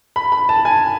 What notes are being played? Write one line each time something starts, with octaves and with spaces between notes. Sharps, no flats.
B5
B5
A5
G#5